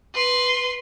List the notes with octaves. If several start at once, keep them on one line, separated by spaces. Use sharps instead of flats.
B4 C6